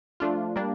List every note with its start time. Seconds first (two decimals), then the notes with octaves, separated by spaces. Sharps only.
0.20 F3 A3 D4 F4
0.56 G3 A#3 D4